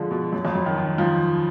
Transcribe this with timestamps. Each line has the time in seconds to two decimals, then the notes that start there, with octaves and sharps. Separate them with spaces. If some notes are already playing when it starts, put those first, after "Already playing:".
Already playing: D3 F3 G#3
0.11 B2
0.33 F#2
0.45 F2
0.55 F#2
0.66 D#3
0.78 D#3
0.98 F3